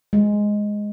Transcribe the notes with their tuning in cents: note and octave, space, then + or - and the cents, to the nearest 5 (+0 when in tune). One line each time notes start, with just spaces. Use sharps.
G#3 +0